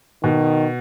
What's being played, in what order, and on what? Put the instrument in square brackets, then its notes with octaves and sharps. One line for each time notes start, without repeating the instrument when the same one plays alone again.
[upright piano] B2 [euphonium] D#3